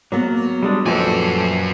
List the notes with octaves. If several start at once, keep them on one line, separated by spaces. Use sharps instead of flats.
F#3 A#3 B3
G3 G#3 D4
A#1 F#2 A4 B4 C5 D5 G#5